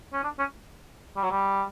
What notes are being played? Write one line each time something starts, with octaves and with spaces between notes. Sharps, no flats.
C#4
D4
C#4
G3
F#3
G3